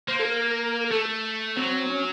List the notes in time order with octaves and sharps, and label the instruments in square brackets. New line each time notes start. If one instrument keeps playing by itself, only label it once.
[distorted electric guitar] A#3 [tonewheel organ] C5
[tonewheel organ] A4
A#4
[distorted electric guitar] A3 [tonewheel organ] A4
[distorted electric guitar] F#3 [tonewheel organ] C4
[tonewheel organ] C#4